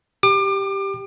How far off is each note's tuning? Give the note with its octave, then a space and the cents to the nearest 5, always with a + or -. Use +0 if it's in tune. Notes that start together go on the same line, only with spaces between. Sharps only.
G4 +0 D6 +30